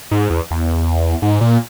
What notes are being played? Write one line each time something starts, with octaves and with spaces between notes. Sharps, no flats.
G#2
E2
E2
G#2
A#2